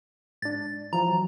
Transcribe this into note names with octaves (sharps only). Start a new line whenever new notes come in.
G#2 D4 A6
E3 F3 A#5
F#3